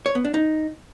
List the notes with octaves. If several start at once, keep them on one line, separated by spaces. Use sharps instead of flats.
C#5
B3
D4
D#4